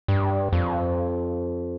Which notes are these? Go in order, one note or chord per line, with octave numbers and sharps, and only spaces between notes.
G2
F2